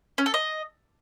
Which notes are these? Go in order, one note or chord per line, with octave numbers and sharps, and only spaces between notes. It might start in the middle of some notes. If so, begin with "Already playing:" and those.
C#4
A4
D#5